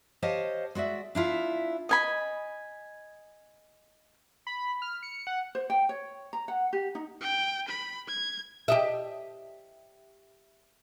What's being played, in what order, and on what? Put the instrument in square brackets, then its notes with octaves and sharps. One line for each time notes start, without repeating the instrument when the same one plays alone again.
[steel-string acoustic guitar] G4 C5 C#5 D#5 F5 A5
G#3 F#4 D5 E5
D4 E4 F4 E5
[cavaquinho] D#5 G#5 B5
[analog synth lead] B5
F6
C#7
F#5
[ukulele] C5
G5
C#5
A#5
F#5
G4
D#4
[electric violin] G5
B5
G#6
[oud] G4 D#5 E5